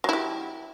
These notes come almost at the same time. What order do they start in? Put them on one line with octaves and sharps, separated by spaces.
F#3 E4 G4